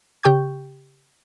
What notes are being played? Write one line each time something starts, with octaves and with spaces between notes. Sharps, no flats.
C#3 G4 G5 C#6 G6